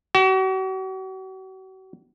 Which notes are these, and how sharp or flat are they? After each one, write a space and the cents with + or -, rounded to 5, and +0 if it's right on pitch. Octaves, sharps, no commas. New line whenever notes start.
F#4 +40